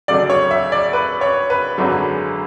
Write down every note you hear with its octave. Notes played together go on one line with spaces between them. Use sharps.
D2 C#3 F#3 A3 D5
C#5
E5
D5
B4
C#5
B4
G#1 F#2 D3 G#3